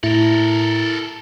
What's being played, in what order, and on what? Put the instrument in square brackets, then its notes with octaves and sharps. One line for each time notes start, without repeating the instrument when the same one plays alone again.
[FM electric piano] A2 [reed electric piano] E4 [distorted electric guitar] A4 A#4